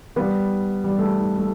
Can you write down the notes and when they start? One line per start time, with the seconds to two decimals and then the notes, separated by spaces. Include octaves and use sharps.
0.16 G3 B3
0.84 G3
0.99 A3
1.38 A3